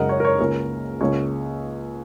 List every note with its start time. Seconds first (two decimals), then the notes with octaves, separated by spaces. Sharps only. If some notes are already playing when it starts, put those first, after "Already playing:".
Already playing: F#2 C#3 G#3 A#4 D#5 F#5
0.09 C#5
0.20 A#4
0.25 C#5
0.39 C#2 C#3 A#3 C#4 A#4
1.01 C#2 C#3 A#3 C#5